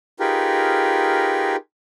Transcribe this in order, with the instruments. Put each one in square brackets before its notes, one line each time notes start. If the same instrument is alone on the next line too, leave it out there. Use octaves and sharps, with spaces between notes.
[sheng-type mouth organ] D#4 F4 G4 G#4 A#4 B4